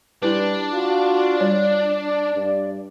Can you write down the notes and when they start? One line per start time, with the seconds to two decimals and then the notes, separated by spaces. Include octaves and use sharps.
0.22 G3 D4 E4 B4
0.73 F4 F#4
1.40 G3 C#5 D5
2.35 G2